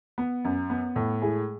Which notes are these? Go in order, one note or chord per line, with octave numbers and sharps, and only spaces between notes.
B3
F#2
B3
A2
G#3 E4 G#4